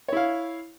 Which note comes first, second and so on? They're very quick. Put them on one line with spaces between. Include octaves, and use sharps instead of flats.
C#5 E4 F5